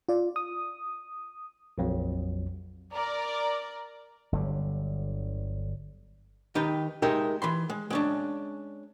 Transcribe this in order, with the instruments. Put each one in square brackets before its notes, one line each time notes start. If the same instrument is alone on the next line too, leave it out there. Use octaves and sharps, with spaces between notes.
[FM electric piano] F4 D5
D#6
[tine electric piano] A#1 F2 F#3
[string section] A#4 D5
[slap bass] G1 D3 F#3 G3
[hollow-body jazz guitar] D#3 D#4 G4 B4
G#3 D#4 G4 A#4 E5
E3 B5 C6
G#3
G#3 C#4 D4